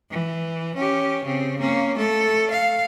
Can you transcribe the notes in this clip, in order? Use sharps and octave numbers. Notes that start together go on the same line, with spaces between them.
E3
C#4 G4
C#3 C4
A#3 C#4
A3 A4
F5